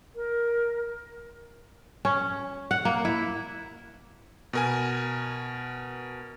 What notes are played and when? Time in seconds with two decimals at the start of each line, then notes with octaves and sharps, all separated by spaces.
0.15 A#4
2.05 C#4
2.71 F#5
2.85 A#3
3.05 E4
4.53 B2 A#4 G#5